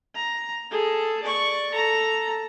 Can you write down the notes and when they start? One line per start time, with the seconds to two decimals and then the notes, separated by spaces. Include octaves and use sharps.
0.15 A#5
0.71 G#4 A4
1.23 D5 C#6
1.73 A4 A#5